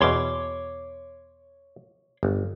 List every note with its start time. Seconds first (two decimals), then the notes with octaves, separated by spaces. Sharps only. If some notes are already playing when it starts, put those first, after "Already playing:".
0.01 E2 B2 C#5 C6 D6
2.23 G1